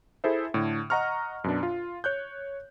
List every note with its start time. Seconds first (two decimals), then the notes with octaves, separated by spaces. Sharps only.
0.24 E4 G#4 A4 C5 E5
0.54 A2 D3
0.90 D#5 F#5 A#5 C#6 F6
1.44 F#2 B2 D4
1.63 F4
2.04 C#5 F#6 G6